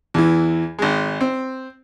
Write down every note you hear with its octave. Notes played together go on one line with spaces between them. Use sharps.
E2 E3
G#1 G#3
C4